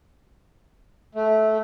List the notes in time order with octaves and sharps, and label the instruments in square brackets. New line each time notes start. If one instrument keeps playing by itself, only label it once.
[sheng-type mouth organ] A3